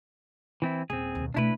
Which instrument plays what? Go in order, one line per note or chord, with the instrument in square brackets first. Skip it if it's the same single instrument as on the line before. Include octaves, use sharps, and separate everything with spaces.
[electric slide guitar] E3 C4 E4
[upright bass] D#1 [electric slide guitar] C4 G#4
[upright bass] D#2 B2
[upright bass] B2 A3 [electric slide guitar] D4 E4 B4